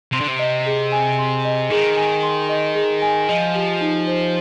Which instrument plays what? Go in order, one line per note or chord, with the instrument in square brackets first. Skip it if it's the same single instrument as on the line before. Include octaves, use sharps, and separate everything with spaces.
[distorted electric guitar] C3 [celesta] C6
[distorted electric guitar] D3
C3
[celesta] D#5
G#4
G#5
C6
D#5
[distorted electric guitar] D#3 [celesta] G#4
[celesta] G#5
C6
D#5
G#4
G#5
[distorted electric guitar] F3 [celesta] D#5
[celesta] G4
D#4
C5